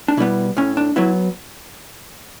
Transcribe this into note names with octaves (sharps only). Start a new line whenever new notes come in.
D4
B2 G3 B3 E4
A2 C#4
D4
F#3 B3 E4